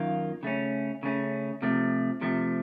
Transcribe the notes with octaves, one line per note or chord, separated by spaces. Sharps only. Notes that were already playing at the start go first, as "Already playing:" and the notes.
Already playing: F#2 D#3 A#3 F4
C#3 A3 C#4
C#3 A3 C#4
C3 F3 A3
C3 F3 A3